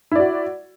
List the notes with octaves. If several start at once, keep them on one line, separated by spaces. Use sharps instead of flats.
E4 F#4 D5